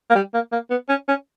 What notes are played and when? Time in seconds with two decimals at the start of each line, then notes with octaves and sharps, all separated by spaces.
0.10 A#3
0.16 G3
0.34 A#3
0.52 A#3
0.71 B3
0.89 C#4
1.08 C#4